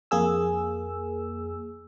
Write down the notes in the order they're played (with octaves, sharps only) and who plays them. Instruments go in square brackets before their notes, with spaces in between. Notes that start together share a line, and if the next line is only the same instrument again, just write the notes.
[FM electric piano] F2 A#3 G#4 E6